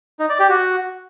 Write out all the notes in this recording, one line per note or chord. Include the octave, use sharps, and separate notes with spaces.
D#4
D5
G4
F#4